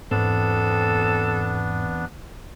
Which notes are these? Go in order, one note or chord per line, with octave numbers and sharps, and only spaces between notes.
E2 G#2 B3 C4 D4 A4